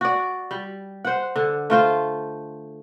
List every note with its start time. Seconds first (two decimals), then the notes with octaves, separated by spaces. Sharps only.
0.01 F#4 D5
0.51 G3
1.05 C5 F#5
1.36 D3
1.70 A3 F4 C5